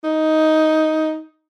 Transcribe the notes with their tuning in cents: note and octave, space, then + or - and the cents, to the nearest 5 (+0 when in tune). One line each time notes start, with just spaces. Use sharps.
D#4 +10